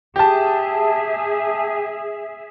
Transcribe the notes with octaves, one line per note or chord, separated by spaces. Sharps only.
G4 G#4 E5 A5